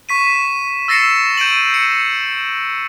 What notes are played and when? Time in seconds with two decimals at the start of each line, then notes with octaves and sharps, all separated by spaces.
0.09 C#6 B6 D#7
0.88 E6 A6 A#6 C7 C#7 E7
1.37 G6 D7 D#7 F#7
1.74 C#7